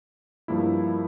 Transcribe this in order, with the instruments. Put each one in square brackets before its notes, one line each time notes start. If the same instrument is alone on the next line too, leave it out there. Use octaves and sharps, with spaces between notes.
[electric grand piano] G2 F3 A#3 E4